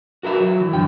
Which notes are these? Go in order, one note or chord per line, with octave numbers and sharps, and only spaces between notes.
F#4 A#4 B4 E5
F#3
E3
F#2 D3 E3 G5